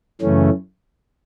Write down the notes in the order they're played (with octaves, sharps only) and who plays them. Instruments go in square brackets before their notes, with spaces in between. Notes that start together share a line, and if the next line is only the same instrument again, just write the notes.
[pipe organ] F#2 C#3 E3 A3 C#4